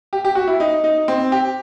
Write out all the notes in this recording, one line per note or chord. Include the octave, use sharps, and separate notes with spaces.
G4
G4
F#4
E4
D#4
D#4
C4
G4